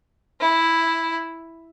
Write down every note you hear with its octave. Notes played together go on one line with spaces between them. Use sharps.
E4